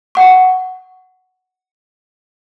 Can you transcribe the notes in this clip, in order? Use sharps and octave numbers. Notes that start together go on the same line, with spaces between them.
F#5 C#6